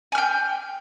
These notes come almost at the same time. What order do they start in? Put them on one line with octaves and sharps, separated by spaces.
G#5 F6 G5